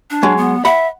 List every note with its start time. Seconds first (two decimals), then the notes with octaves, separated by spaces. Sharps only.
0.10 D4
0.23 F#3 G#3
0.37 B3
0.65 E5 F#5 B5